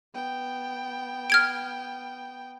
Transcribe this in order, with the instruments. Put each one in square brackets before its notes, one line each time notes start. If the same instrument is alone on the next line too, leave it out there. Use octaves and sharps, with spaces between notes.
[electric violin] B3 G5
[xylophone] F6 G#6 D7